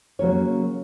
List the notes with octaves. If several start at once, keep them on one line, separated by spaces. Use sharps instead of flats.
C#3 F#3 A#3 C#4 C#5